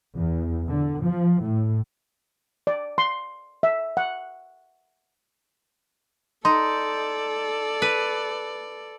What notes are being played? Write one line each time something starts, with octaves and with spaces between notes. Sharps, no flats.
E2
D3
F3
A2
D5
C6
E5
F#5
D#4 A4 D5 C6
B4